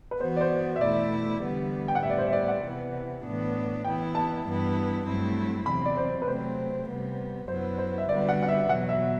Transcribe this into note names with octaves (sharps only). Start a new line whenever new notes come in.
B4
E3 B3 F#4 C5
D5
C5
E5
E2 B2 A3 E4 D5
E2 D3 G3 B3
G5
F#5
A2 G3 B3 E5
D5
C5
E5
D5
F#5
C3 E3 B3
A2 E3 B3 D4
E3 B3 E4 G5
A5
G2 E3 B3 E4
G2 F#3 A3 C4 E4
E2 C3 F#3 C4 B5
D5
C5
B4
C3 F#3 A3 C4 C5
C3 G3 B3
F#2 F#3 B3 E4 C5
C5
E5
D3 G3 B3 F#4 D5
F#5
F#5
E5
E2 B2 F#3 F#5
E5